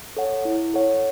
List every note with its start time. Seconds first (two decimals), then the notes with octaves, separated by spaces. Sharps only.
0.17 A4 C#5 F#5
0.45 E4
0.74 A4 C#5 F#5